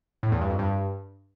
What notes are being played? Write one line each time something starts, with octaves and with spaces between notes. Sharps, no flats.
A2
E2
G2
F2
G2